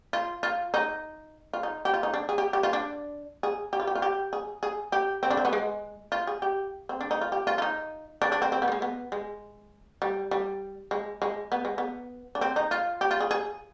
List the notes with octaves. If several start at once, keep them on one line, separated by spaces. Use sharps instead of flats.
F4
F4
D#4
F4
D#4
G4
F4
D#4
D4
G#4
G4
G4
F4
D4
G#4
G4
F4
G4
F4
G4
G#4
G#4
G4
C4
D4
C4
B3
G#3
F4
G#4
G4
C4
D4
D#4
F4
G4
F4
F4
D#4
D4
D4
C4
C4
B3
G3
G#3
B3
G#3
G3
G3
G#3
G#3
B3
G#3
B3
D4
C4
D#4
F4
G4
F4
G#4
G#4